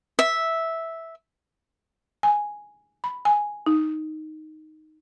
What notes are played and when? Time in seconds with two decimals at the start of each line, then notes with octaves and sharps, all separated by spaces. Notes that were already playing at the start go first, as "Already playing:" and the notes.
0.19 E5
2.23 G#5
3.04 B5
3.25 G#5
3.66 D#4